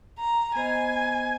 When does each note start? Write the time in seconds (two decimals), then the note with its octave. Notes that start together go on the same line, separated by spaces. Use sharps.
0.19 A#5
0.55 B3 C5 D#5 G#5